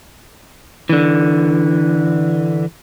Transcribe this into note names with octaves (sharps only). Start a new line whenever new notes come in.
D3 E3